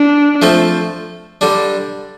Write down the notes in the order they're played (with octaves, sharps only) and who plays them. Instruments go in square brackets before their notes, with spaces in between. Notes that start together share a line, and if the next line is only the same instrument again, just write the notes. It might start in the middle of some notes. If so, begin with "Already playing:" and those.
Already playing: [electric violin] D4
[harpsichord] F3 A3 C4 A4
D3 G3 D4